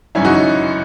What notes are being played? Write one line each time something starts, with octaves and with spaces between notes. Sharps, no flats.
G#1 F#2 C#3 C#4 E4
D#4 F#4